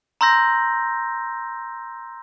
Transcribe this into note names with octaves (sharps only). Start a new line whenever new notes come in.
A#5 C6 E6 G6 A#6